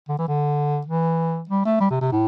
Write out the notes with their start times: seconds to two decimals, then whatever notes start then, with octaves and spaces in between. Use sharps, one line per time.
0.09 D3
0.18 E3
0.28 D3
0.87 E3
1.49 G3
1.65 A3
1.80 G3
1.91 C3
2.01 C3
2.12 A2